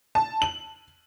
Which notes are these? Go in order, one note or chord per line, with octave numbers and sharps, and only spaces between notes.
A5
F#7